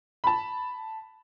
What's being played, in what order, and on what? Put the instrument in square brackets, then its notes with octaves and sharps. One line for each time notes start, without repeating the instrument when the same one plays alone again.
[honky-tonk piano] A5 B5